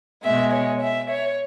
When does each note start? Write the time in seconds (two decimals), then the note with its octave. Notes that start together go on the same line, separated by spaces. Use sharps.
0.23 B2 G#3 E5
0.52 C#5
0.81 E5
1.10 C#5